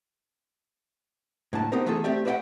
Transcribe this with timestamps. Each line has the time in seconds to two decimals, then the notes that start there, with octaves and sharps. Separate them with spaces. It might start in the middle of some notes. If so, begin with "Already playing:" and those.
1.53 A2 D3 A#3 A5
1.72 B3 C4 D#4 G4 A#4 C5
1.86 E3 A3 F4 G#4 A4
2.04 A3 C4 G4 D5 E5
2.25 B4 C5 D5 E5 F#5 G5